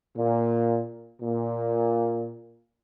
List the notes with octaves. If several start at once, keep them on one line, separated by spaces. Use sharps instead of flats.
A#2
A#2